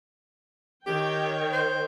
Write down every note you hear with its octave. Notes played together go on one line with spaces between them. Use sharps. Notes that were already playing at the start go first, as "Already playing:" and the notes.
D#3 G4 C#5 G5
C5